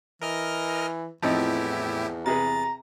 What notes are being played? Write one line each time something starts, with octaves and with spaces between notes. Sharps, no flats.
E3 A#4 D#5 F6
E2 A2 F3 C4 D#4 E4 G4
C3 G#4 B4 A#5 A6